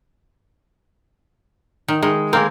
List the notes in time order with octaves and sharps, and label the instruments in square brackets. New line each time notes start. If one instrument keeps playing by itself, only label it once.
[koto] D#3
[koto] D#3 [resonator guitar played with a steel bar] G#3
[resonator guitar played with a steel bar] G#3 A#3 A#4 [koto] C4